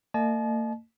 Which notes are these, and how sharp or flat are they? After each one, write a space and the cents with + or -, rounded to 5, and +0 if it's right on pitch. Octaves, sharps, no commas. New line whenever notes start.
A#3 -45 D#5 -40 A5 -45